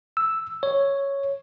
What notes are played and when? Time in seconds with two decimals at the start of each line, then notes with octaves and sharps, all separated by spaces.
0.17 E6
0.63 C#5